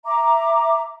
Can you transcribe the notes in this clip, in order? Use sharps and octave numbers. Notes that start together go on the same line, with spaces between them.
E5 A#5 D6